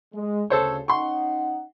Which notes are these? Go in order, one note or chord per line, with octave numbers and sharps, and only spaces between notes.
G#3
D2 C#3 A4 C5 C#5
C#4 D#4 F#5 C6 C#6